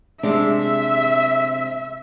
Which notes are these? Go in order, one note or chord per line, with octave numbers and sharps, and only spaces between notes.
C3 G#3 D4 E5